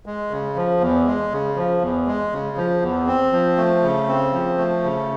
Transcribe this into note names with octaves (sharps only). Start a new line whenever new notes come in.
G#3
C#3
F3
E2
G#3
C#3
F3
E2
G#3
C#3
F3
E2
C4
F3
A3
C#3
C4
F3
A3
C#3